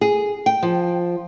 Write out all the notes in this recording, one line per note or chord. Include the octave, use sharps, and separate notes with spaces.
G#4
G5
F3